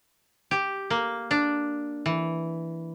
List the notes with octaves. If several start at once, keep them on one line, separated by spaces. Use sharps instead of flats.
G4
A#3
D4
E3